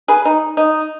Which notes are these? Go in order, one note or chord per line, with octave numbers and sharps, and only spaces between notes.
G#4 B4
D#4
D#4